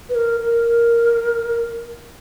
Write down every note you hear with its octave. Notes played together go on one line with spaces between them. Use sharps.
B4
A#4
A#4